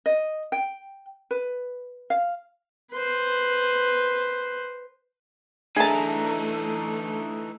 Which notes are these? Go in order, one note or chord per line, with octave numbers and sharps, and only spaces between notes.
D#5
G5
B4
F5
B4 C5
E3 A3 D4 D#4 G#4 E5 A5 A#5